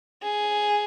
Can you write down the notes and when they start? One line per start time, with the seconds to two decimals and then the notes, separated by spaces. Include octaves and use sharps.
0.22 G#4